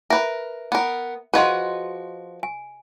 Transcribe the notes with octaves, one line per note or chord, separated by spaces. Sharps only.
A#4 B4 E5
B3 A#4
F3 F#4 G#4 B4 D#5 C6
G#5